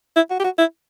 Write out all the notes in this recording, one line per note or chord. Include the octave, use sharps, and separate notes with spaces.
E4
F#4
G4
F#4
E4